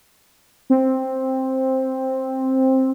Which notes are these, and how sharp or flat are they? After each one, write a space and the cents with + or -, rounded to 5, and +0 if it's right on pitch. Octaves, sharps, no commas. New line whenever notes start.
C4 +5